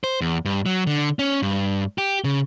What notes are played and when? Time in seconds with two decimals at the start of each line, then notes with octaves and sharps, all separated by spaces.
0.04 C5
0.21 E2
0.45 G2
0.66 F#3
0.87 D3
1.19 C#4
1.43 G2
1.98 G4
2.24 C#3